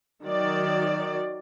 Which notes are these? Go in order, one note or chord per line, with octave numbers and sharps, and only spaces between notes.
D#3 F#3 D5